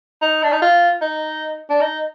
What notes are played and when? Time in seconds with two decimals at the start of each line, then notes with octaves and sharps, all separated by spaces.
0.22 D#4
0.43 D4
0.53 D#4
0.62 F4
1.02 D#4
1.70 D4
1.81 D#4